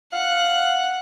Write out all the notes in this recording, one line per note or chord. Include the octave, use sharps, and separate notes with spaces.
F5 F#5 F#6